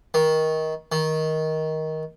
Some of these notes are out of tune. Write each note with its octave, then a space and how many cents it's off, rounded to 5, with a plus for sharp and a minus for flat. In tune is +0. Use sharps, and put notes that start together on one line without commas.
D#3 +20
D#3 +15